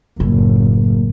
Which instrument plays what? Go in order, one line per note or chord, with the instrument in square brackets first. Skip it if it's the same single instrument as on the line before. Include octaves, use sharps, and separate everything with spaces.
[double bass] F#1 [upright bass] A2